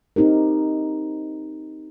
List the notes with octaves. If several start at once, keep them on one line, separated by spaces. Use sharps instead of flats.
C4 D#4 G4 A#4